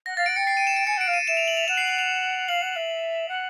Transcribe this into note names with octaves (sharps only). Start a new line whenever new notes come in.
F#5 A#6
F5 A6
F#5 D7
G5 C#7
C7
D#7
E7
D7
G#5 C#7
F#5 D7
F5
D#7
E5 E7
F7
F#7
F7
F#5 E7
C7
C7
F7
F5 F#7
F#5
E5
F#5